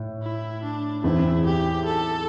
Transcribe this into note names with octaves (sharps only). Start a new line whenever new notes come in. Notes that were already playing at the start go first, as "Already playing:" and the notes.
Already playing: A2
E4
D4
E2 E3 C4 E4
G4
A4